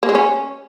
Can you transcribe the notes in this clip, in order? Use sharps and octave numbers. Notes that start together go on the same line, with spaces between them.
A#3
G#3
C#4